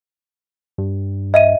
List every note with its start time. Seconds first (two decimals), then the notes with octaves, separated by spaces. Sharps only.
0.78 G2
1.34 D#5 E5 D#7